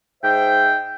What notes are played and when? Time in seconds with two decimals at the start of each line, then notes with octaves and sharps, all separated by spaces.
0.23 G#2 D#4 C5 E5 G5